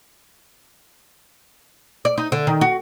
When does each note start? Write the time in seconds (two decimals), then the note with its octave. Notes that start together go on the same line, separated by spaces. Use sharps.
2.05 D5
2.18 D#4
2.32 D3
2.47 D#3
2.61 F#4